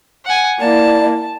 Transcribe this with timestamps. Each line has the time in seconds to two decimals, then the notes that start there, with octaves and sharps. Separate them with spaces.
0.25 F#5 G#5
0.60 A#3 E4 D5 A5